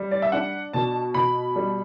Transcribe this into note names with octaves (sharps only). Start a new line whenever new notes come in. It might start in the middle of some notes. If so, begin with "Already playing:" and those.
Already playing: G3
D5
E5
D4 F#5
B2 A5
B2 B5
G3